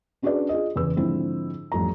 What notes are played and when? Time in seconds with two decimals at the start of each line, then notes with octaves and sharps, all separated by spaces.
0.22 C#4 D4 F#4 G#4 B4 D5
0.49 F4 G#4 D#5
0.76 E2 C#3 B4 E6
0.97 G#2 D3 F3 C4 E4
1.72 A1 F2 G3 A#5